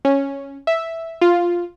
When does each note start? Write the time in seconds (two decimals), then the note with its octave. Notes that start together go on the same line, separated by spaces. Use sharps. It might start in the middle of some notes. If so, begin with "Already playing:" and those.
0.05 C#4
0.67 E5
1.22 F4